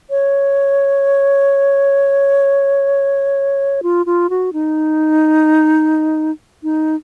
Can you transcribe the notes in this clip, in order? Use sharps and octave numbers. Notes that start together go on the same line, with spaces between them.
C#5
F4
F4
F#4
D#4
D#4